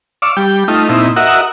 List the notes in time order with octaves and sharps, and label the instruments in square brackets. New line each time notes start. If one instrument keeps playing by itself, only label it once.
[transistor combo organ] D5 F5 C#6 D6 E6
G3 G5
A3 D#4 F4
A#2 C4 D#4 E4
F#4 A#4 D#5 E5 F#5